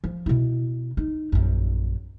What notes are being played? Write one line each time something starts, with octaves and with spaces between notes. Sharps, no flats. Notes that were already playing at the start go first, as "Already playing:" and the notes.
F3
B2 E4
D#4
A#1 F#2